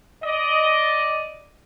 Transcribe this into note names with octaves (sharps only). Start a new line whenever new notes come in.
D5 D#5